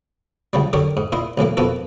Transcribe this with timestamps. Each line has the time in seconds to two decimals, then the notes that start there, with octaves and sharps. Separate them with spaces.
0.53 C#2 C#3 F#3 G3
0.73 D3 F#3 G4 A#4 C#6
0.97 G#2
1.12 A#2 E4 D#5 C6
1.37 B1 A2 E3 A#3
1.57 F2 B2 A#3 B3 F#4 A4